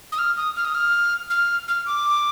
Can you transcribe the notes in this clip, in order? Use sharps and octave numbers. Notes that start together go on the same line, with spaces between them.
D#6
F6
D#6
F6
D#6
F6
F6
F6
D6